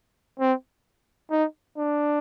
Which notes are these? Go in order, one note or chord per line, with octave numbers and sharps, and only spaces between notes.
C4
D#4
D4